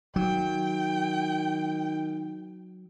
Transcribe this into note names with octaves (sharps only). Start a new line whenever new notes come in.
D#3 F#3 G5